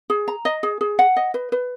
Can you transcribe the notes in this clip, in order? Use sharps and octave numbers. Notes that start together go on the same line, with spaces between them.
G#4
A#5
D#5
G#4
G#4
F#5
D#5
B4
B4